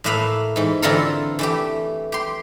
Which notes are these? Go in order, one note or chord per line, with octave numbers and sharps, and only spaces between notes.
A2 A3 A#3 B4 E5 F5
G#2 E3
D3 E3 C4 F4 A4 A#4
E3 A3 G4
G4 C6